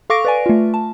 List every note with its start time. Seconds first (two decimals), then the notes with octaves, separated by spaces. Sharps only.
0.10 A4 F5 C#6 D6 A#6 D7
0.25 B4 D5 G#5
0.46 A3 F4
0.74 A5